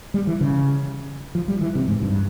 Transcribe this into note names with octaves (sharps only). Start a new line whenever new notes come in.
G3
E3
C#3
F3
G3
E3
C3
G#2
G2